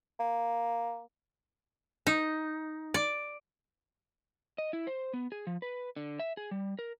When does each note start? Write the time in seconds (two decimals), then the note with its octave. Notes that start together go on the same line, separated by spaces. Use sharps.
0.20 A#3
2.07 D#4
2.94 D5
4.58 D#5
4.73 E4
4.87 C5
5.14 B3
5.32 G#4
5.47 F3
5.62 B4
5.96 D3
6.20 E5
6.37 G#4
6.51 G3
6.79 A#4